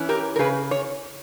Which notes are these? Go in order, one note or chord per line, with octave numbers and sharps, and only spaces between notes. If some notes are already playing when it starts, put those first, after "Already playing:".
Already playing: E3 C#4 E4
G4 A#4
A#4
C#3 G#4 B4
C#5